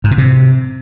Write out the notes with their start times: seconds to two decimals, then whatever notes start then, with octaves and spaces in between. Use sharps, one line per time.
0.04 G#2
0.11 B2
0.18 C3